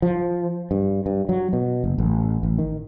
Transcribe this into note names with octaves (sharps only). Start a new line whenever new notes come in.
F3
G2
G2
F#3
B2
F#1
A1
A1
D#3